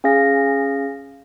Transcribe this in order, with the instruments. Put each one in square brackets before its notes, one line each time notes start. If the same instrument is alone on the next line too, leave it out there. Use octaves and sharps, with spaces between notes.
[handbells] C#4 G#4 F5 A#6